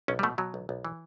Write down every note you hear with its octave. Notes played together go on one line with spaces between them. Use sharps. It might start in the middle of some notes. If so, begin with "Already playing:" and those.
B1 C#4
G3
B2 A3
B2 F#3
B1
B1
E3